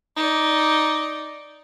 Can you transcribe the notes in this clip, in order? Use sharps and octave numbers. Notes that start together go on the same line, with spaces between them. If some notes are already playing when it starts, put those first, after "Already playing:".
D#4 D5